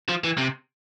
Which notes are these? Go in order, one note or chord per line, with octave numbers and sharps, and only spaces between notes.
F3
E3
C3